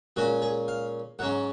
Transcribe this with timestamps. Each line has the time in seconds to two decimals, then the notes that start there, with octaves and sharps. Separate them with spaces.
0.16 A#2 G#3 C#4 F#4
0.42 G#4
0.68 F5
1.19 G#2 F#3 C#4 F#5